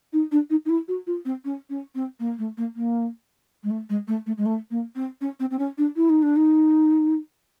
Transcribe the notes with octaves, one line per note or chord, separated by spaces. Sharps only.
D#4
D4
D#4
D#4
E4
F#4
F4
C4
C#4
C#4
C4
A#3
A3
A#3
A#3
G#3
A3
G#3
A3
A3
G#3
A3
A#3
C4
C#4
C4
C4
C#4
D4
E4
D#4
D4
D#4